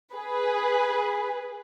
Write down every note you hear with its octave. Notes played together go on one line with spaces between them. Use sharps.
G#4 B4